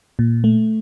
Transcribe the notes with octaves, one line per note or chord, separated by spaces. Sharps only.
A#2
A3